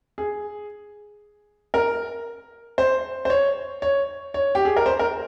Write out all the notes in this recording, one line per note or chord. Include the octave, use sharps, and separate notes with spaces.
G#4
A#4
C5
C5
C#5
C#5
C#5
G4
G#4
A#4
C5
A#4